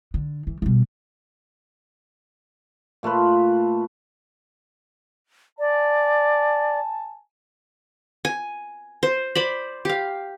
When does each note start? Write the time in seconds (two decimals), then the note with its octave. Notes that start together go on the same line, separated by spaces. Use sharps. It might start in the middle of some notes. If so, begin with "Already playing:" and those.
0.14 D3
0.47 E3
0.62 B2 G3
3.03 A#2 A3 F4 B4
5.59 D5 G#5 A5
8.25 G#5
9.03 C5
9.35 C5 D5 B5
9.85 G4 F5